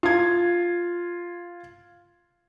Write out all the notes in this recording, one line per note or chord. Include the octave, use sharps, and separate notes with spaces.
F4 G#6